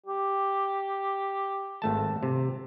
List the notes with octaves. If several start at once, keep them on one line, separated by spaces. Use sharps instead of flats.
G4
G#1 A3 A5
C3